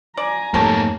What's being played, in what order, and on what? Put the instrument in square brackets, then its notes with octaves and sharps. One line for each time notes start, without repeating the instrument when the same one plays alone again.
[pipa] D5 [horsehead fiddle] G#5 A#5
[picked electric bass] F2 G#2 [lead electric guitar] A3 A#3 [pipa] G4 C#5 A5